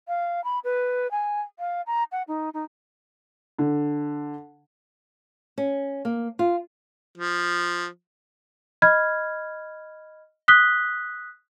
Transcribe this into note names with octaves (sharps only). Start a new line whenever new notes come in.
F5
B5
B4
G#5
F5
A#5
F#5
D#4
D#4
D3
C#4
A#3
F4
F3
D#5 B5 F6 G#6
D#6 F#6 B6 G7